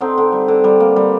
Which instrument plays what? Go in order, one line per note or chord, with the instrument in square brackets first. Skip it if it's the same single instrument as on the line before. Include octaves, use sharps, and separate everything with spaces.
[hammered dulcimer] D3 C4 D#4
D3
G3
D3
G3
A#3
G3